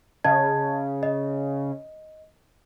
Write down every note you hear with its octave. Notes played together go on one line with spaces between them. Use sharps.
C#3 D#5 A5 G#6
D#5